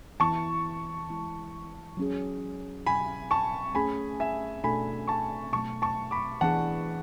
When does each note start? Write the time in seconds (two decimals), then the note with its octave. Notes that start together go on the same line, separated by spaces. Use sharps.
0.20 E3 B3 E4 A5 C#6
1.09 E3 G#3 B3 E4
1.97 F#3 C#4 G#4
2.86 B2 F#3 C#4 G#5 B5
3.31 A5 C#6
3.75 A3 C#4 G#4 G#5 B5
4.20 E5 G#5
4.64 B2 A3 D4 F#4 A4 G#5 B5
5.08 A5 C#6
5.53 B2 F#3 A3 A5 C#6
5.82 A5 C#6
6.11 B5 D6
6.41 E3 B3 D4 G#4 F#5 A5